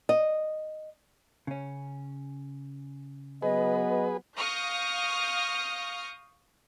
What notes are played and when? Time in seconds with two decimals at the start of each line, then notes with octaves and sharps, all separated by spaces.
0.09 D#5
1.47 C#3 C#4
3.42 F#3 B3 G#4 B4 D#5
4.37 F5 C#6 D#6 F6 G6 A#6